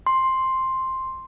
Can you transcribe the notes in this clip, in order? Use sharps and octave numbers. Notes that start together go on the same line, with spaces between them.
C6